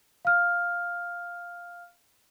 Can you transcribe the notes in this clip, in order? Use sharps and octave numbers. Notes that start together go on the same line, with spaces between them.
F5 F6